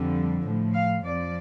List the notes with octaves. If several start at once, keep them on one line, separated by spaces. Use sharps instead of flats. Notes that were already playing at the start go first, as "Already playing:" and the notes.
Already playing: F2 D3 G3
A2 F3
F5
F2 F3 D5